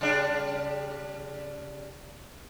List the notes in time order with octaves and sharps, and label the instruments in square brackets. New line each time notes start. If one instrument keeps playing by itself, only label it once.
[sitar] C#3 G3 D4